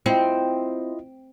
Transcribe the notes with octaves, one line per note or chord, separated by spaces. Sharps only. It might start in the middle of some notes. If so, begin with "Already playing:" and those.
C4 E4 F4 D#5